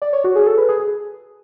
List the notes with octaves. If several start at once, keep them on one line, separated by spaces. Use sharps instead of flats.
D5
C#5
F#4
G#4
A4
B4
G#4
G#4